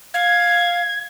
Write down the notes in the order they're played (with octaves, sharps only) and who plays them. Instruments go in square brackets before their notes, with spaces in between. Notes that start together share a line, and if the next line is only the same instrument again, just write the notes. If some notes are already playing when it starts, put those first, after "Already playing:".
[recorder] F5 [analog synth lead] G#6